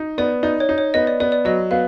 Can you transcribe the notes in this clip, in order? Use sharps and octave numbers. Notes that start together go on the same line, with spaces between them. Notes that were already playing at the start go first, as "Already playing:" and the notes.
Already playing: D#4
B3 D5
D#4 D5
C#5
D#4
C#5
B3 D#5
D5
B3 D5
D5
F#3 D#5
B3 F5